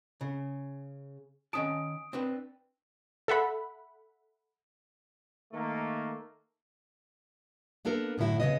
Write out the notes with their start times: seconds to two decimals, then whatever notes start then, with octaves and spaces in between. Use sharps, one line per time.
0.21 C#3
1.53 D#3 C#4 A5 D#6 D7
2.13 C4 D4 B4
3.28 A4 E5 F#5 B5
5.52 D#3 A3 A#3
7.85 A#3 B3 D4 A4 A#4
8.18 F#2 A2 D3 E4 F#4
8.40 D#2 C#3 F3 G#3 B3 D#5